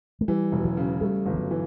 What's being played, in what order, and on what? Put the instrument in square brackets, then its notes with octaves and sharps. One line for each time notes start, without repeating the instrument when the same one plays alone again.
[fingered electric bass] A3
[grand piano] E3 [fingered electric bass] G3
[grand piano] E1
[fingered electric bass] F#3
[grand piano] C#3
[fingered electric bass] G3 [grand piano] A3
[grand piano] G1
[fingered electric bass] E3
F#3
[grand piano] E3